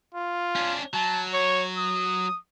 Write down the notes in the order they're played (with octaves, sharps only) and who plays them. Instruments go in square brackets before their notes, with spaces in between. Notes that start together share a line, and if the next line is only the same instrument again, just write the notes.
[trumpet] F4
[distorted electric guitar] C#4 D4
[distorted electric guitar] F#3 [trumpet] A5
[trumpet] C#5
D#6